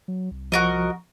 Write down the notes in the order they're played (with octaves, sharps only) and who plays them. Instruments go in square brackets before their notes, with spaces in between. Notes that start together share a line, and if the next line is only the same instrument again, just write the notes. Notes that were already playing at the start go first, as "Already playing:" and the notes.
[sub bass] F#3
C2
[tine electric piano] F3 C#6 [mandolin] F#4 A#4 D#5